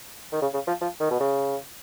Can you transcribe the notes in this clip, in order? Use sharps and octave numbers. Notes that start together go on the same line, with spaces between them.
D#3
C#3
C#3
F3
F3
D#3
B2
C#3